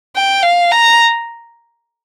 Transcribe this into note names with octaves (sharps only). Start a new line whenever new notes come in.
G5
F5
A#5